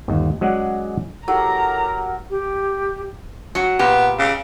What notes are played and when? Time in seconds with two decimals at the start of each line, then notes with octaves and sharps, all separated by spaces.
0.08 G1 D#2
0.41 F#3 G#3 C#4 G#4 D5 F#5
1.28 F#3 E4 G4 A4 A#4 A#5
2.30 G4
3.55 F#3 F#4
3.79 A#2 B3 G4
4.19 C#3